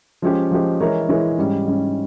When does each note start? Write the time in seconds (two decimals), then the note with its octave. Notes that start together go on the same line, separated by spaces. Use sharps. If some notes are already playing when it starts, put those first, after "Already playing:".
0.22 F3 G#3 C#4 G4
0.51 F3 G#3 C#4 G4
0.80 E3 G#3 E4 A#4 C#5
1.09 E3 G#3 E4 A#4 C#5
1.38 G#2 G3 C#4
1.66 G#2 G3 C#4